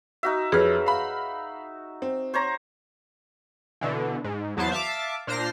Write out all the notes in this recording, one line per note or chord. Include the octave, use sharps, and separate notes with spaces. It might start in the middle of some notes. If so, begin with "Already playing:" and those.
D#4 F#4 E5
F2 G#4 B4 C#5 F6
F5 B5
C4
C5 C#5 A#5
B2 D3 E3
G#2
E2 F#3 B3 C5 A5
E5 F5 A5 D6
A#2 D4 C5 F6 A#6 C7